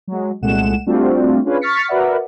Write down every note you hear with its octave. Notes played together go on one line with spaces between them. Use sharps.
F#3 G#3
C2 A#2 G#3 A3 F#5 E7
G3 A3 C4 D4 F4 F#4
C#4 D4 F4 G#4 B4
C#6 F6 A6 B6 C#7
F#4 A#4 B4 D5 E5 F#5